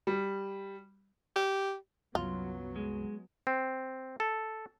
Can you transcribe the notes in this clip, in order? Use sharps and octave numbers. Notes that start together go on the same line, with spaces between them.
G3
G4
C2 F#2 F#3 B3 F4
G#3
C4
A4